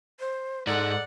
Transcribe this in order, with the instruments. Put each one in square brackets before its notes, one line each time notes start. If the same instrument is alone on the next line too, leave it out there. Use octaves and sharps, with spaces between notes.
[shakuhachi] C5
[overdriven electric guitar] G#2 [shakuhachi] A4 [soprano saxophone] D5 [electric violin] F#5